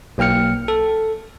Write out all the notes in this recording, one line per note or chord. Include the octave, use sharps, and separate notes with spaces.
B1 A#3 G5 F6 C#7
A4